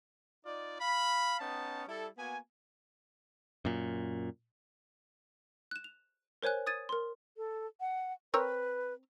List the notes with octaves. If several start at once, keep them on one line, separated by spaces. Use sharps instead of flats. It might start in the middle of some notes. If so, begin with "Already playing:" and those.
D#4 F4 D5
F5 B5
B3 C#4 D#4 G5 A5
G3 E4 A4
A#3 B3 F#4 G#5
F#2 A#2
F#6 E7
F7
A#4 C5 C#5 G#5 F#6
D#6 G#6 A6 D#7
A#4 C6
A4
F#5
C4 A#4 B4 C#5